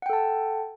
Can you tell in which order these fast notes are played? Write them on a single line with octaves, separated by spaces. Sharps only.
F#5 G5 A4 A5